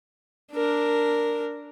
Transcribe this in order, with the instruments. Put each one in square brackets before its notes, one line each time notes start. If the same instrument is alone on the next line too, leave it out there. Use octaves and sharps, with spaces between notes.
[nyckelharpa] D4 A#4